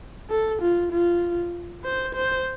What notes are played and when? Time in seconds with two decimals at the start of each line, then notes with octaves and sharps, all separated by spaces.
0.30 A4
0.62 F4
0.92 F4
1.84 C5
2.15 C5